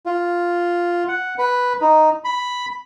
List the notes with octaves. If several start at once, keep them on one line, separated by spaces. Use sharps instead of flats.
F4
F#5
B4
D#4
B5